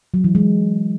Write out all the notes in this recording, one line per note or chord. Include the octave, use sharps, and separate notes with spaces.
F#3
E3
G#3